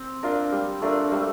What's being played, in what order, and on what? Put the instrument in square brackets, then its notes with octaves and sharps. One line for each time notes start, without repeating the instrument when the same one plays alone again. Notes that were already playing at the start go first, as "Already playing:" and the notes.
Already playing: [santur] C4
[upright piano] D4 F4 A#4
G3
[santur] A3 [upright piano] D4 F4 A#4
[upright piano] G3 [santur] A3